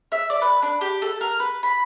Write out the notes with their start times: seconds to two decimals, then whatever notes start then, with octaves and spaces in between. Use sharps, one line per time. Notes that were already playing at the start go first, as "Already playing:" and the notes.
0.12 E5
0.30 D5
0.42 B4
0.62 D4
0.81 G4
1.02 A4
1.21 A#4
1.40 B4
1.63 B5